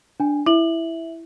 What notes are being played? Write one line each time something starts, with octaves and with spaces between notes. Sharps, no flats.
D4 G#5
E4 E5 F#7